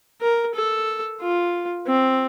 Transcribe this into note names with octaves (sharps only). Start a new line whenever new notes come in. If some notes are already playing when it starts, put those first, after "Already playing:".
A#4
A4
F4
C4